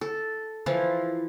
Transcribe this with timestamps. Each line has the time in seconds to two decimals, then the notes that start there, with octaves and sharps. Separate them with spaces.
0.01 A4
0.66 E3 F3 E4 F4